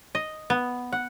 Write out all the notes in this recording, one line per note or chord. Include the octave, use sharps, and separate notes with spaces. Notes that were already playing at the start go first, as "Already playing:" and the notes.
D#5
B3
F#5